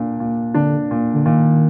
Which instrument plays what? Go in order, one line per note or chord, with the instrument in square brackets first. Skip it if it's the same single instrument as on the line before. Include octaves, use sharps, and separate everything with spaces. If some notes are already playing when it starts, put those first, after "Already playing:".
Already playing: [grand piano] A#2 D4
A#2
[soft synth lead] D3 [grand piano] D4
[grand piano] A#2
[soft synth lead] D3
[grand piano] A#2 [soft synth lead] D#3